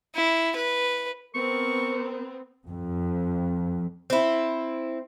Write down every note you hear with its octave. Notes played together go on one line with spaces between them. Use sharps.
E4
B4
B3 C4 A#4 C#6
F2
C4 E4